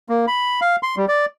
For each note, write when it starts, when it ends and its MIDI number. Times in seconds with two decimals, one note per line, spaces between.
0.09 0.26 58
0.27 0.60 83
0.61 0.76 77
0.83 0.96 84
0.97 1.06 55
1.08 1.26 74